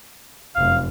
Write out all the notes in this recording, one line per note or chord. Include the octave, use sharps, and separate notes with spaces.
F1 F#2 F5